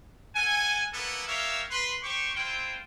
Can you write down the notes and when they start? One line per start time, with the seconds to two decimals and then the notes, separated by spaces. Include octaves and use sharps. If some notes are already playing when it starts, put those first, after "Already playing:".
0.36 A4 F#5 G#5
0.93 A#3 B3 E4 A4
1.28 G4 A#4 C#5 E5 F5
1.71 B4 C6
2.03 G4 C5 G5 C#6
2.36 C4 E4 F4 C5 G5